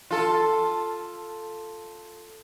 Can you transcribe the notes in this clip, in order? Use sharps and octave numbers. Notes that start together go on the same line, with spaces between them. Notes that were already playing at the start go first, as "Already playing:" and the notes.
F4 A4